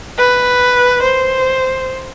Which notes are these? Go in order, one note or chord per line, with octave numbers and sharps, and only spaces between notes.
B4
C5